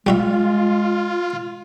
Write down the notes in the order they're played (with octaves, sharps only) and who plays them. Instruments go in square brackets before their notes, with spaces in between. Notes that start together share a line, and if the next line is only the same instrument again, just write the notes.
[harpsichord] G3 F#4 E5 [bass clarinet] G#3 [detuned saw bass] F4